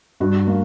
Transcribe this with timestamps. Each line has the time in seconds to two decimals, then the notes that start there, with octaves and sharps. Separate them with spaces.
0.20 G2 F#4
0.47 A#3